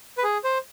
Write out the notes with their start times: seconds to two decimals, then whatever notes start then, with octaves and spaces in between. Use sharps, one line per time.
0.17 B4
0.23 G#4
0.44 C5